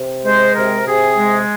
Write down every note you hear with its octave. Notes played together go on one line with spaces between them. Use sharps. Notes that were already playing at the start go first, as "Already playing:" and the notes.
Already playing: C3
G#3 C5
C3 A#4
C3 G#4
G#3